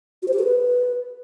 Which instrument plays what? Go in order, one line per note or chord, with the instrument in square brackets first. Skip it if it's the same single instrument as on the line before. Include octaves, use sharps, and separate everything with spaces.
[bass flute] F#4
C5
G4
A4
B4